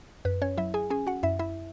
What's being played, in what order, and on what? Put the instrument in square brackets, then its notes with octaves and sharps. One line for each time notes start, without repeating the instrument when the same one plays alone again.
[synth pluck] F#2 B4
C#4 C#5
F#3 E4 E5
G#4 G#5
C#4 G#4 G#5
F#4 F#5
F#2 E4 E5
E4 E5